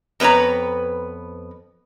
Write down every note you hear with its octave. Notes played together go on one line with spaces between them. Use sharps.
F2 B3 B4 C#5 A#5